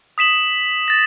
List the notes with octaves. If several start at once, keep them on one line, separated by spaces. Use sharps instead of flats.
D#6 B6 E7 F#7
A6 A#6